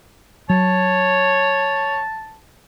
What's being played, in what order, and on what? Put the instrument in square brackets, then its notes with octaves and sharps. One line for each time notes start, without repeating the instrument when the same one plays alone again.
[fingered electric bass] F#3 [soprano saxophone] C#5 [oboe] A5